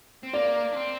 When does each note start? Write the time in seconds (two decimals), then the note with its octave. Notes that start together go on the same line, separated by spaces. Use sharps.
0.23 C4
0.33 A#3 D5
0.73 D4
0.76 C4